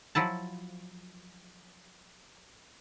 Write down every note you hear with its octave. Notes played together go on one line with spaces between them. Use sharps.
F3 F#3 E4 A5